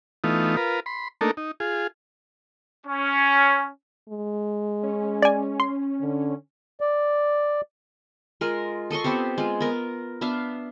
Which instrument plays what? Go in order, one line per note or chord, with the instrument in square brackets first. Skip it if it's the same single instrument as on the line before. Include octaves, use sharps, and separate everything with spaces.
[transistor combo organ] E3 A3 B3 D#4 F4
F4 A#4 B4
B5 C6
A3 A#3 D4 D#4 A4 A#4
D#4
F4 G#4
[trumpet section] C#4
[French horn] G#3
[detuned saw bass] C#4
[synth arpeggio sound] D5 G#5
C6
[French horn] D3
[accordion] D5
[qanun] G#3 F4 A#4
A4 D#5 C6 C#6
B3 C4 G4 C5
G#3 F4
B3 A#4
B3 D4 E5 F5